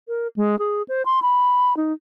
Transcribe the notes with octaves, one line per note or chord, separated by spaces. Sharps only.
A#4
G#3
G#4
C5
C6
B5
D#4